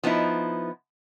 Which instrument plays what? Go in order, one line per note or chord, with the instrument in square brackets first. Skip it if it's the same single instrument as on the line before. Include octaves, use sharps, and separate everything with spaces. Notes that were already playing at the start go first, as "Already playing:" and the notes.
[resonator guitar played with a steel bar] F3 B3 D#4 E4